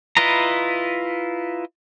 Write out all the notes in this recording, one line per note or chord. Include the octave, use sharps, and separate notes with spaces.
E4 F4 B4 D#5 A#5